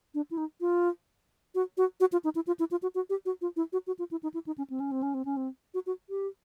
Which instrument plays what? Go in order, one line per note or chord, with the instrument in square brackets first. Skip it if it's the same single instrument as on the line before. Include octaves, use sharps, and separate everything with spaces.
[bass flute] D4
E4
D#4
F4
F#4
F#4
F#4
F4
D#4
E4
F4
E4
F4
F#4
F#4
G4
F#4
F4
E4
F#4
F#4
F4
E4
D#4
E4
D#4
C#4
C4
C#4
C4
C#4
C4
C#4
C4
F#4
F#4
G4